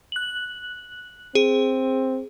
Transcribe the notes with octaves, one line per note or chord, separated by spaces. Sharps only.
F#6 F#7
C4 G#4